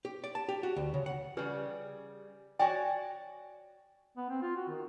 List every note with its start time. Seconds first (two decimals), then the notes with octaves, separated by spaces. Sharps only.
0.05 G4
0.24 D5
0.35 A5
0.49 G4
0.63 F#4
0.76 D2
0.94 C#3
1.06 F#5
1.37 C#3 G3 G4 B4
2.59 F#4 C#5 D5 G5 G#5
4.17 B3
4.29 C4
4.42 F4
4.56 F#4
4.68 D#3